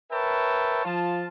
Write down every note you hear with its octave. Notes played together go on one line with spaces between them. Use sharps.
A#4 B4 C#5 E5 G5 A5
F3 F4 A5